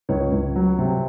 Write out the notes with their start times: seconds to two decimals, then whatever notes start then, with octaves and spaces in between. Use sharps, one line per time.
0.09 C#2 C#5
0.32 C#2
0.56 F#3
0.79 C3